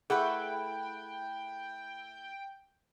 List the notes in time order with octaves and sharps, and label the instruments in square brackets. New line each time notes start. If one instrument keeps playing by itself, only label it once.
[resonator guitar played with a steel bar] A3 E4 [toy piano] G#4 [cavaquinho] B4 F#5 [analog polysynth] G5